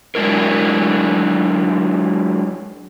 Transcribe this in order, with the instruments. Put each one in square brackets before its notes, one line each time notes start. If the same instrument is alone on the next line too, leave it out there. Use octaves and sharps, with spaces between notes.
[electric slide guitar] F#3 G#3 D4 E4 A#4